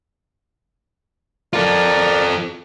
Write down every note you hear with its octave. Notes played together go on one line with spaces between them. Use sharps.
F4 A4 A#4 D5